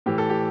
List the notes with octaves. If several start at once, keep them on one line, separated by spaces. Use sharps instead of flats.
A2 E3 G4
A4
G4